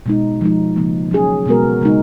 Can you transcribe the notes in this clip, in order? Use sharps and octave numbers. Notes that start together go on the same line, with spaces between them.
B2 G#3 D#4
F3 G#3 D#4
C#3 F3 A#3
F#3 C#4 G#4
B2 G#3 B3 F#4 A#4
C#3 G#3 D#4